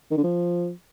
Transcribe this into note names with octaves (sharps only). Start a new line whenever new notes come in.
D#3
D3
F3